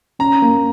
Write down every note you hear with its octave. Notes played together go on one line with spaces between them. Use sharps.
C#4 A#5
A#3